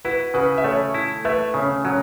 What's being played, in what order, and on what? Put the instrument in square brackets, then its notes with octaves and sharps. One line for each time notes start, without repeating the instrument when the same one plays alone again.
[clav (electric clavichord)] E4 [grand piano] F#4 B4
[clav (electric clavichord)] C#3 [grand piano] F#4 B4
[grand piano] E5
[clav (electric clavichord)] A3 [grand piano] A4 C#5
[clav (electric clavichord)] E4
[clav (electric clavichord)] A3 [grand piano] B4 E5
[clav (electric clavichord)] C#3 [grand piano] C#4
[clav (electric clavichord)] F#3 [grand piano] C#4 F#4